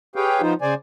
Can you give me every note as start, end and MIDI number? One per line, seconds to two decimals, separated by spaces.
0.16 0.41 67
0.16 0.41 68
0.16 0.41 71
0.16 0.41 73
0.16 0.41 77
0.16 0.41 79
0.41 0.54 53
0.41 0.54 59
0.41 0.54 63
0.41 0.54 65
0.41 0.54 72
0.62 0.74 49
0.62 0.74 72
0.62 0.74 74
0.62 0.74 80